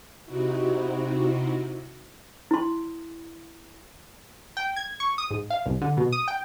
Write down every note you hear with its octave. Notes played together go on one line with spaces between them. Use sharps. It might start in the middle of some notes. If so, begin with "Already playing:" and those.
C3 C4 D#4 E4 F#4
E4 C6
G5
G#6
C#6
D#6
G#2
F5
C2
D3
B2
D#6
G5